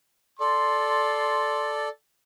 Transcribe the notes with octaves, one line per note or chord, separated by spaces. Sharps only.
A4 D5 C6